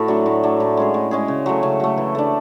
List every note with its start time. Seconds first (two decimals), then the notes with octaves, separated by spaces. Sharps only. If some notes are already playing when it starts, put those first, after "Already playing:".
Already playing: A2 F#4 A4
0.08 F#3 A3 D4
0.26 A2
0.43 F#3 A3 D4
0.60 A2
0.77 G#3 C#4 G#4
0.94 A2
1.11 G#3 C#4 G#4
1.28 C#3
1.46 F#3 A3
1.63 C#3
1.80 F#3 A3
1.98 E3
2.15 A3 D4